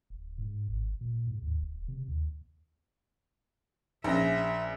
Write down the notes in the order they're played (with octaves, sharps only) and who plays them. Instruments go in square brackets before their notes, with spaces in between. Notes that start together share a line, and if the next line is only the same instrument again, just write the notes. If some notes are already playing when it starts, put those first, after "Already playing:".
[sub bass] D1
G#2
G#1
A#2
G#2
D#2
D1
C3
D#2
[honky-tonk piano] A#1 C#4 A#6 [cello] E5